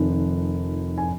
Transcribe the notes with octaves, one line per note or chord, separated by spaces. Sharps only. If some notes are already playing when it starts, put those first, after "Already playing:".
Already playing: F1 F2 D#3
G#5